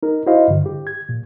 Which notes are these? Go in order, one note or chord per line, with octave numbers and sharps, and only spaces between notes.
D#4 A#4
E4 F#4 C5 D#5 F5
G2 D3
G4
G#6
A#2